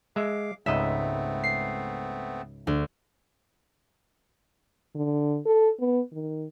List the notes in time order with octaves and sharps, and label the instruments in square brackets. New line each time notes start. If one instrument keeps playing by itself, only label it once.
[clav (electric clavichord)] G#3 E5 [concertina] F5 D6
[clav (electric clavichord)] C#2 G#2 D#5 [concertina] A3 B3 C4 [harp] E5
[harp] C7
D2
[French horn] D3
A4
B3
D#3